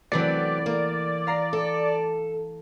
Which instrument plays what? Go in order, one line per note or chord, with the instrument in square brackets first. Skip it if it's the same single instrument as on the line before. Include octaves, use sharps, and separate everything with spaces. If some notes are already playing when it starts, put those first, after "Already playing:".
[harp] E3 A3 [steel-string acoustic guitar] F#3 B3 C4 [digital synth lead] D5
[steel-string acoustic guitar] A#3
[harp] F5 A#5 C7
[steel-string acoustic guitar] A4